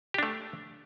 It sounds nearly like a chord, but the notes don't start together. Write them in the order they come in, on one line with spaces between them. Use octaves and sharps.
G4 D4 A3